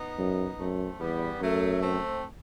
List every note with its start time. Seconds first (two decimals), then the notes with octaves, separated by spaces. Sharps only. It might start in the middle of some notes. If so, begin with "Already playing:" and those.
Already playing: B3 D#4
0.19 F#2
0.59 F#2 A3 C4
1.00 E2 G3 B3
1.40 F#2 F#3 A3
1.81 A3 C4